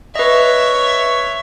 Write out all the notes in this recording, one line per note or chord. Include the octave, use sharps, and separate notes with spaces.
B4 C#5 D#5 E5